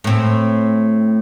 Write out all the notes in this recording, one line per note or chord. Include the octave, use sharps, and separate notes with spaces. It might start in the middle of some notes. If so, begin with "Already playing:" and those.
A2 C4